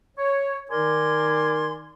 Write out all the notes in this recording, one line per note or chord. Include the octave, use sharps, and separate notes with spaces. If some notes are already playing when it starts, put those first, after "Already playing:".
C#5
D#3 D#4 A#4 D5 G#5 C6